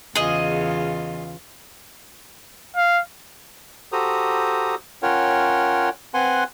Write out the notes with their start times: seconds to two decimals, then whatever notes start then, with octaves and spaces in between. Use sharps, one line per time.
0.15 E2 C#3 F4 G#4 D#5
2.76 F5
3.92 F#4 G4 A4 C5 A#5 D#6
5.03 C#4 F4 A#4 C#5 F#5 G5
6.14 C4 B4 F#5 G#5 C6